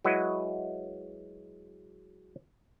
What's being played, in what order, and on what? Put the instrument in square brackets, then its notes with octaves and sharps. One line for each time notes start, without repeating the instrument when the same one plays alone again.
[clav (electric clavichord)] F#3 G#3 E4 F#4 B4 D#5